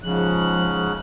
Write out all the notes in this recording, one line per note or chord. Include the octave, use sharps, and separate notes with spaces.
G#2 C#3 F3 F#6